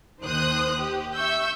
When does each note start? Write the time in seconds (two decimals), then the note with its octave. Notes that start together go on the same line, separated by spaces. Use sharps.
0.22 D#2 D#3 C5 D#6 F#6
0.79 G4
1.14 E5 C#6 E6 G6